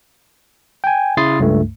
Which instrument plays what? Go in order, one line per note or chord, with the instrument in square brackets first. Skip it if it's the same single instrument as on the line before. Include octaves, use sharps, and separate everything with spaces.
[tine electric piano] G5 G#5
C#3 E4 C6 D#6 A6 C7
C#2 G2 A3